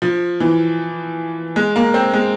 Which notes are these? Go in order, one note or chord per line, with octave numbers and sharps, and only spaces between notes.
F3
E3
G#3
A#3
C4
G#3